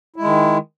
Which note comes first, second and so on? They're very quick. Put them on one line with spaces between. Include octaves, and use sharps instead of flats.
E4 G#3 D#3